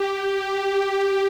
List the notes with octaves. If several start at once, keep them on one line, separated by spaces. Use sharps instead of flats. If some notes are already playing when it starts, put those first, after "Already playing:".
Already playing: G4
G4